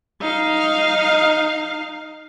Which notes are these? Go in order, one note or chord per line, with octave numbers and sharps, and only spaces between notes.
D#4 F5